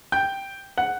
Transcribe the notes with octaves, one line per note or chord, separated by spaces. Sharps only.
G5 G6
F#5 F#6